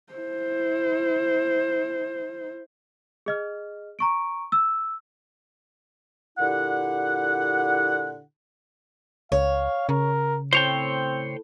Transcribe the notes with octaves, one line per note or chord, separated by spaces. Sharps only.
E4 C5
G#4 D#5 F6
A#5 C#6 D7
E6
A#2 D3 E4 G4 F#5
C#2 C#5 F5
C#3 A#4
A2 C4 C5 C#5 G5